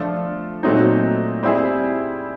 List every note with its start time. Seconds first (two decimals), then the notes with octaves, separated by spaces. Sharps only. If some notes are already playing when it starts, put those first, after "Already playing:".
Already playing: F3 A3 D4 F4 A4
0.63 A#2 F#3 A3 C4 D#4
1.43 G3 C4 E4 G#4